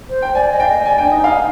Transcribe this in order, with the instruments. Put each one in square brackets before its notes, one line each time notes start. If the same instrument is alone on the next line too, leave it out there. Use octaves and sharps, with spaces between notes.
[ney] C5
[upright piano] G5
[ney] D5 [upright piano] G#5
[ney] D#5
[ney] F5 [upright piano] G5
[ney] D#5
[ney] D5 [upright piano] G#5
[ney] D4 [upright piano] G5
[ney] D#4 [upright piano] D#5
[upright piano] F5